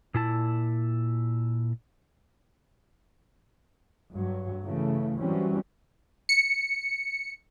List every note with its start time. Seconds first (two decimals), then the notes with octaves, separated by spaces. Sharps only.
0.14 A#2 E4 A5
4.12 G2 F#3
4.64 C#3 E3 A3
5.18 E3 F#3 G3 C4 C#4
6.29 C#7